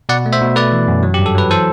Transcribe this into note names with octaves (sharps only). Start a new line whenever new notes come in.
B2 D5 F#5
A3
C5 E5
B2
A3 B4 D5
E3
F#2
F#3
G2 G4
A4
F#3 B4
E3 A4 C5